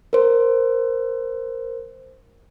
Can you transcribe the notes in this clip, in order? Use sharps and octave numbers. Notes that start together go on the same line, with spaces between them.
A#4 C5